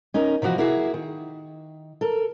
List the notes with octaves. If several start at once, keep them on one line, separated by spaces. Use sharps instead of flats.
C#4 D#4 A#4
C3 E3 F3 F#4
A#3 E4 F#4 G#4
D#3
A4 A#4